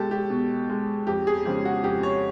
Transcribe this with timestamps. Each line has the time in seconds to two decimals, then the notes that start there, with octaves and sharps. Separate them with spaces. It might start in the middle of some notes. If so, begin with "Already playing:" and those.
Already playing: B2 G#3 G4 A4
0.11 G4
0.30 B2
0.70 G#3
1.07 F2 G4
1.27 G#4
1.45 C#3 F3 G#3 G4
1.65 F#4
1.84 F2 G4
2.03 C#5